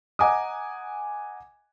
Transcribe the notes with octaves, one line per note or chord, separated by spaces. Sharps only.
D#5 F#5 G#5 A#5 D6 D#6